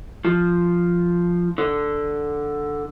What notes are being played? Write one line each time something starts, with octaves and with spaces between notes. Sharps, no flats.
F3
D3